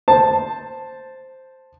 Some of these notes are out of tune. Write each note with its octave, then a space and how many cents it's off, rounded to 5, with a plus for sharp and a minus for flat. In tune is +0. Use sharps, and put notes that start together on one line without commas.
C5 +0 A5 +0